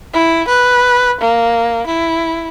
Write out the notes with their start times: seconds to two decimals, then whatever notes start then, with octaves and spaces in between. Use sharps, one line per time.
0.13 E4
0.48 B4
1.21 A#3
1.87 E4